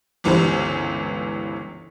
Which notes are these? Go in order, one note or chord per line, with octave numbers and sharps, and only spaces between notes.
G1 C#2 E3 G3 C5